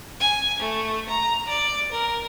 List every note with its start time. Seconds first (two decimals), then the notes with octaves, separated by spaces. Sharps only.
0.21 G#5
0.60 A3
1.09 A#5
1.48 D5
1.92 A#4